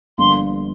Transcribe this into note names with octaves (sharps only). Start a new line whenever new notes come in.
G1 G2 D3 F3 A#3 C6